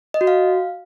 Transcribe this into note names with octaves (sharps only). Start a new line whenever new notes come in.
D#5
F#4
F5